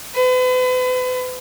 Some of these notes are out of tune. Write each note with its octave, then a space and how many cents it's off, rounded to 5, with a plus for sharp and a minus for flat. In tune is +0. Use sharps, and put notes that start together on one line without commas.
B4 +40